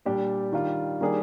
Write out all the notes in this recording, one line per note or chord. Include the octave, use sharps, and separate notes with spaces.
A#2 G3 D4 G4
D#3 G3 D4 F4
D#3 G3 A#3 D4 G#4